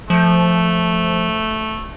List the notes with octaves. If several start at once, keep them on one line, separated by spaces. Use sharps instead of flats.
F3 A3